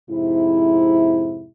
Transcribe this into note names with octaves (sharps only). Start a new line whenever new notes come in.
F2 G#2 C3 E4